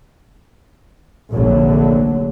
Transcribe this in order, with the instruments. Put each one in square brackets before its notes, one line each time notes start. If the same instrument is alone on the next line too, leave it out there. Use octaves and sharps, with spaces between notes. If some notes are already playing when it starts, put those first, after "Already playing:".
[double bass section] F1 A#1 D3 F#3